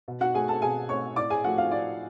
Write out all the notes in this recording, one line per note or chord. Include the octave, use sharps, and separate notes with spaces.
B2
F#4 F#5
A3 G#4 G#5
A4 A5
B2 G#4 G#5
A3 C#5 C#6
A2 D5 D6
G#4 G#5
F3 A3 F#4 F#5
F4 F5
A2 D5